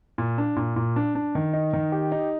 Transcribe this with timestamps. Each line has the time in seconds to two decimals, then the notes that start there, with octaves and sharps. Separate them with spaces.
0.18 A#2
0.38 D4
0.56 A#2
0.76 A#2
0.96 D4
1.15 D4
1.35 D#3
1.53 D#4
1.73 D#3
1.92 G4
2.12 D#4